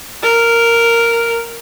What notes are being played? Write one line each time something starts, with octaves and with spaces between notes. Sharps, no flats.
A#4